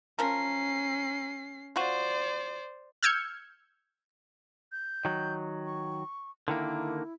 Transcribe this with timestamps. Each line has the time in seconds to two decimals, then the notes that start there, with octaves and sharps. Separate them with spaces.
0.19 F3 C#4 A#4 C7
1.76 F4 F#4 C5 D5
3.03 E6 F6 G6 G#6 C#7
4.72 G6
5.05 D#3 F#3
5.65 C#6
6.48 D3 D#3 A#3 E4